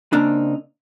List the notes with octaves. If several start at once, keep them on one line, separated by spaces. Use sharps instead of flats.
C#3 A#3 C4 D4 D#4